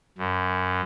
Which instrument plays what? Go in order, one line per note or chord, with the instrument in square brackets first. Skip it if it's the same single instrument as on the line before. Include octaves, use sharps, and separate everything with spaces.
[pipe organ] F#2